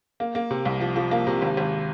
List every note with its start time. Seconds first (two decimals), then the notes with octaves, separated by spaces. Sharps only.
0.20 A#3
0.35 A#3
0.51 C3
0.65 C2
0.81 F3
0.96 F3
1.11 A#3
1.27 C3
1.42 G#1
1.57 G#1